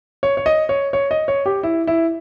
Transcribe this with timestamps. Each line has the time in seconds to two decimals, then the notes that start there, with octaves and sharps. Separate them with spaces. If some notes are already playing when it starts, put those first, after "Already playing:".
0.23 C#5
0.37 C#5
0.46 D#5
0.69 C#5
0.93 C#5
1.11 D#5
1.28 C#5
1.46 G4
1.63 E4
1.87 E4